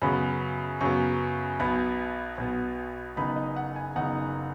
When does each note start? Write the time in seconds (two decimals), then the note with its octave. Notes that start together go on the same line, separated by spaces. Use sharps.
0.02 F#2 C#3 F#3 B3 B5
0.81 F#2 C#3 F#3 B3 C#6
1.60 B1 B2 B3 B5
2.38 B1 B2 B3
3.16 F#1 F#2 C#3 B3 D#4 B5
3.36 D#5
3.56 F#5
3.76 G#5
3.95 F#1 F#2 C#3 B3 D#4 F#5